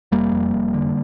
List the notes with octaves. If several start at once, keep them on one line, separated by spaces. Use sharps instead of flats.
F1 G3 A#3
F2
F1
D3